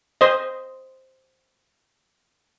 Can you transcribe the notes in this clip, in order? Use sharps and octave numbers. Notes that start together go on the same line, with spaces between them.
C5 D#5